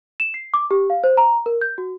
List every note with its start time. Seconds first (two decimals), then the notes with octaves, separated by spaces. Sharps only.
0.20 E7
0.34 C7
0.54 D6
0.71 G4
0.90 F5
1.04 C5
1.17 A#5
1.46 A#4
1.61 G6
1.78 F#4